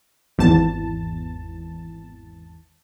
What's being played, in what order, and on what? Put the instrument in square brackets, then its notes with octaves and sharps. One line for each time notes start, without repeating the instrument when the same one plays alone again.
[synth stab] G#1 E2 A5